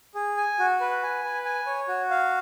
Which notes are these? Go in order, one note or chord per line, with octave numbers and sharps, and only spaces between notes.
G#4
G#5
F#4
B4
G#5
B4
G#5
C#5
F#4
F5